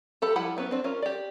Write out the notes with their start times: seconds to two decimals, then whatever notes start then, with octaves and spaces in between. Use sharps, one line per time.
0.22 G4 A4 B5
0.36 F3 G3 E4 F#5 B5
0.57 F#3 B3 C#4 B4
0.71 C4 D4
0.84 C#4 F4 A#4
1.02 G4 D5